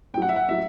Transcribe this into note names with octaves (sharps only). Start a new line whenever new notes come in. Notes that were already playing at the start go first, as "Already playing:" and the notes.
A2 F#3 F#5 G5
E5
F#5
A2 F#3 E5